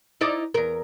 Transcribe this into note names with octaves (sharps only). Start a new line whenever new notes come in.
D#4 E4 D5
E2 A#4